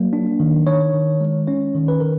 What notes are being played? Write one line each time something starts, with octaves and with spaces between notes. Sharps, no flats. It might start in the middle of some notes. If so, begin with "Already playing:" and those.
Already playing: F#3 A#3
D4
D#3
D#3 C#5
D#3
G#3
C#4 C#5
D#3
B4
D#3 A#4